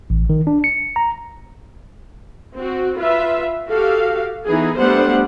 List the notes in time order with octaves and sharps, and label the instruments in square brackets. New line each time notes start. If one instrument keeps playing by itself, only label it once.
[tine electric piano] A1
D#3
D4
C#7
A#5
[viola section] C4 F#4
F4 B4 E5
F#4 G4 A4 F5
E3 B3 D#4 E4 G#4
G3 A3 B3 D4 C5 F#5